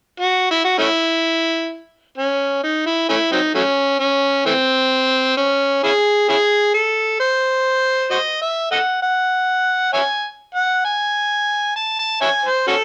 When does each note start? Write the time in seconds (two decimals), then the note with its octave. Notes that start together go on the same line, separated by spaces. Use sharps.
0.20 F#4
0.51 E4
0.65 F#4
0.78 A3 C#4 E4
2.18 C#4
2.64 D#4
2.86 E4
3.09 A3 C#4 E4
3.32 F#3 C4 D#4
3.55 F#3 A3 C#4
4.00 C#4
4.46 E3 A3 C4
5.37 C#4
5.83 C#4 E4 G#4
6.29 C#4 E4 G#4
6.74 A4
7.20 C5
8.11 F#4 C5 D#5
8.42 E5
8.71 A4 D#5 F#5
9.02 F#5
9.93 C#5 E5 G#5
10.55 F#5
10.85 G#5
11.76 A5
11.99 A5
12.21 C#5 E5 G#5
12.45 C5
12.67 C#4 F#4 A4